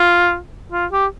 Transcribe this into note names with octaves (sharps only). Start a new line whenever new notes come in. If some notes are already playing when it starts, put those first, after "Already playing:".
Already playing: F4
F4
G4